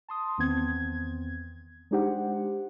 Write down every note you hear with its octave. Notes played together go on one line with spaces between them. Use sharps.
A5 C6 D#6
E2 D#3 B3 C4 G#6
G#3 D4 D#4 G4 C5 F#5